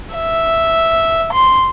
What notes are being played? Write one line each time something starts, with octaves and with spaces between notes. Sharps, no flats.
E5
C6